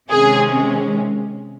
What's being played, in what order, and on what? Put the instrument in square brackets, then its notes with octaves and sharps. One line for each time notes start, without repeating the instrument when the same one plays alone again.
[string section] C3 D#3 G#3 C#4 [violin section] G#4